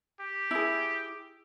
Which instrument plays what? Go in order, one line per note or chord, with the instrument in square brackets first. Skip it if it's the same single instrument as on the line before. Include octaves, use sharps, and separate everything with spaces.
[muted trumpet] G4
[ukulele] E4 G#4